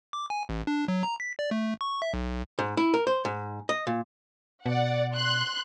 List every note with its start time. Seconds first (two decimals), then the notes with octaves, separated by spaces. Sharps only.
0.13 D6
0.30 G#5
0.49 A1
0.67 D4
0.88 F#3
1.03 A#5
1.20 B6
1.39 D5
1.51 A3
1.81 C#6
2.02 E5
2.14 B1
2.59 G#2
2.77 E4
2.94 A#4
3.07 C5
3.25 G#2
3.69 D#5
3.87 A#2
4.66 B2 D5 F#5
5.15 C6 F#6